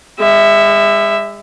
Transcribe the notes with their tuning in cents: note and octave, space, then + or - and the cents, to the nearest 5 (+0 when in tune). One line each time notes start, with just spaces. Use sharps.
G#3 -40 E5 +0